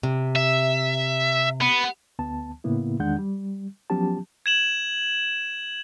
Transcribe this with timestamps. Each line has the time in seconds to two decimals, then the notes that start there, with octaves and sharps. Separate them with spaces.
0.03 C3
0.36 E5
1.62 B3
2.19 D2 B3 A5
2.64 A2 C#3 A#3 B3 E4
2.99 E2 D#3 G#3 D4 F#5 G6
3.19 G3
3.90 F3 F#3 B3 C#4 G4 A5
4.46 G#6 E7 F#7